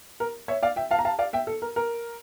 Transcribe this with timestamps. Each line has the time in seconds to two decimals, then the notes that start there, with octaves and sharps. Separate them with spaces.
0.20 A#4
0.48 C#5 E5
0.63 D5 F5
0.76 E5 G5
0.91 F5 A5
0.99 A#5
1.05 F5 A5
1.19 D5 F5
1.33 E5 G5
1.47 A4
1.62 A#4
1.76 A#4